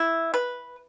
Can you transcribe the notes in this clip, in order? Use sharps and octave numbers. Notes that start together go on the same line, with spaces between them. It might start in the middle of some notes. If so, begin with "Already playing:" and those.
Already playing: E4
B4